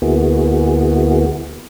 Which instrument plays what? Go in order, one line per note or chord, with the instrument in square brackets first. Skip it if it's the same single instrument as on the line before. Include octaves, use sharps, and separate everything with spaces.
[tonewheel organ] D2 A#3 B3 E4 F#4 G#4